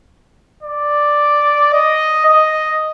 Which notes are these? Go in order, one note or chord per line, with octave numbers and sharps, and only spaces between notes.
D5
D#5
D#5